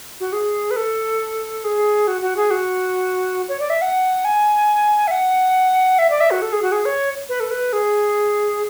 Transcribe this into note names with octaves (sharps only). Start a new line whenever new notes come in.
F#4
G#4
B4
A4
G#4
F#4
F#4
G#4
F#4
C#5
D5
E5
F#5
G#5
E5
F#5
E5
D5
E5
F#4
A4
G#4
F#4
G#4
C#5
B4
A4
B4
G#4